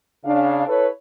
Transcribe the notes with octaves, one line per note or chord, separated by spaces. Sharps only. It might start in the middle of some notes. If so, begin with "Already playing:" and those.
C#3 D4 F5
E4 A4 B4 C#5